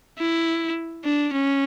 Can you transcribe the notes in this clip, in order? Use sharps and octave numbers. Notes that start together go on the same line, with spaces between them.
E4
D4
C#4